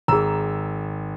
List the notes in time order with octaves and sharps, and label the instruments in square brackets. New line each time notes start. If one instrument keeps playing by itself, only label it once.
[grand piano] G#1 E6 [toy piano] G#4 A#5